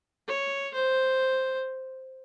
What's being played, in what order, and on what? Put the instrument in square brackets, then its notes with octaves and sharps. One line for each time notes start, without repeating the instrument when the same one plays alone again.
[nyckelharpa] C#5
C5